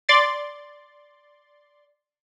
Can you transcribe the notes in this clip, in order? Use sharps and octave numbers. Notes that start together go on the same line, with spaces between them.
D5 C6 A6